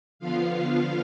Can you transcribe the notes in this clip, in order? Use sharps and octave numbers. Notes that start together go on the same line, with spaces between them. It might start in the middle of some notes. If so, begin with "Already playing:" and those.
D3 F3 B3 F4 F5